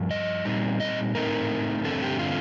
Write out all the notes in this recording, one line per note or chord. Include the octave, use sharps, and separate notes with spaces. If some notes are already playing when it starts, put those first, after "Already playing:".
Already playing: G2 F3
D#5
A#2 G3 C4 D#4
D#5
A2 A3 C4 D#4 A#4
G2 D3 A3 C4 A4
G4
F4